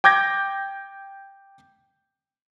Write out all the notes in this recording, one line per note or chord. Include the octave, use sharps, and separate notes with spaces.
G5 D6 G6 G#6 A#6